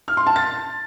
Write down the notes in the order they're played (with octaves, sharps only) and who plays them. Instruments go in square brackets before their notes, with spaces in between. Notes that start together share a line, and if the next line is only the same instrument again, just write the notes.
[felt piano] F6
C6
A5
A6